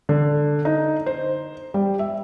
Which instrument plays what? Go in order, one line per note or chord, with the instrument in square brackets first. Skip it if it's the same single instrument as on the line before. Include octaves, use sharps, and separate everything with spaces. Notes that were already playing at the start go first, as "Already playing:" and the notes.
[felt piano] D3
D#4
C5
G3
E5